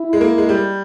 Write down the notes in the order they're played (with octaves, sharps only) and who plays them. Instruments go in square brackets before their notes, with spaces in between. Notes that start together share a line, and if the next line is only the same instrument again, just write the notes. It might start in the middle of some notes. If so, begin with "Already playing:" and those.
Already playing: [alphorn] E4
[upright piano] G#3
A#3
G#3
G3